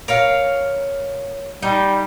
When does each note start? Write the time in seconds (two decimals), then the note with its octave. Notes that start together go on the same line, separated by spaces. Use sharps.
0.08 A#4 C#5 F5
1.62 G3 D#4